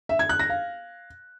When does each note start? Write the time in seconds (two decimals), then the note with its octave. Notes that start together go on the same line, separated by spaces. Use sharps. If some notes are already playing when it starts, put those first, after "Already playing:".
0.09 E5
0.19 G#6
0.29 F#6
0.39 A#6
0.50 F5